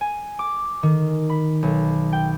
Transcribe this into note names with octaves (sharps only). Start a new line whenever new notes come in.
G#5
D6
D#3
B5
B1
G5